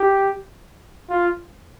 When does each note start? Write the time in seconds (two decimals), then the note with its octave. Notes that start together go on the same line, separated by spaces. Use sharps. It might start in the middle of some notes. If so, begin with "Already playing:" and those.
Already playing: G4
1.10 F4